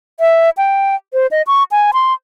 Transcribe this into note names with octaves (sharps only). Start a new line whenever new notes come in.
E5
G5
C5
D#5
C#6
G#5
C6